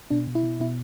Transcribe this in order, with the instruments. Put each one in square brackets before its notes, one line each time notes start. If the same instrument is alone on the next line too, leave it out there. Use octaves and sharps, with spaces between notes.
[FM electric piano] B2 D4
B2
E4
B2
B2 E4